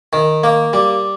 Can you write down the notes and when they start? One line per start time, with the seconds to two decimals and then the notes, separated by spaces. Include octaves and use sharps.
0.13 D#3
0.44 A#3
0.73 G3